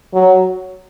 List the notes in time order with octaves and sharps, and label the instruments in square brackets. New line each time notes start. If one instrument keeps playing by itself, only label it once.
[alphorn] F#3